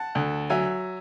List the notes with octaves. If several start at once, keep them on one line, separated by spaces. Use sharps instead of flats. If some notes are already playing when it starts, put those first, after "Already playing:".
Already playing: F#5 A5
D2
F#3 E5 G#5